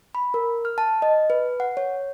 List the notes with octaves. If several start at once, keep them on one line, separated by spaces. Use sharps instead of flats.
B5
A#4
F6
A5
D#5
B4
F#5
C#5